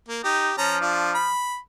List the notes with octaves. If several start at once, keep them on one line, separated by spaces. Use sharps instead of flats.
A#3
D#4 G4
F3 C#4 A5 A#5
D4 F4
B5